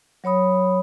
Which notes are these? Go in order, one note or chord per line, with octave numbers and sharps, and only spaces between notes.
F#3 C#5 B5 D#6